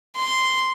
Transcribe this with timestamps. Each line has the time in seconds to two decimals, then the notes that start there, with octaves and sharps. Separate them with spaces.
0.16 C6